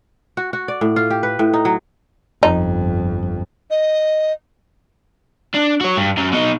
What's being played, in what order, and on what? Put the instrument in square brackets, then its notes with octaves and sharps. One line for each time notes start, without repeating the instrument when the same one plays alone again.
[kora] F#4
F#4
D5
A2
F4
G4
B4
A2
D#4
F#3
[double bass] G1 F2 [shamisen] D#4
[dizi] D#5
[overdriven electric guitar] D4
F#4 C#5
G2
F#2
B2 D#4